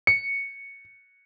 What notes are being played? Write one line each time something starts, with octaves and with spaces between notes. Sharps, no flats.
C#7